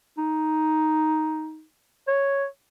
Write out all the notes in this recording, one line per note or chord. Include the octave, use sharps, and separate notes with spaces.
D#4
C#5